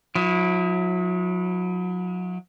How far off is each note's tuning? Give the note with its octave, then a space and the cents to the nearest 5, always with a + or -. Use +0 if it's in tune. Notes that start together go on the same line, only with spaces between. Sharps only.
F#3 -35 E4 -5